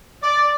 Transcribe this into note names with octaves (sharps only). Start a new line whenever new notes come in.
D5